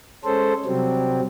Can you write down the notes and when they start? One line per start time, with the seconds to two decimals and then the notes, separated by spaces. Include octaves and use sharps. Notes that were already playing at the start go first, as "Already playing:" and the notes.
0.25 G#3 C#4 A4 C5
0.65 C3 F#3 G3 C4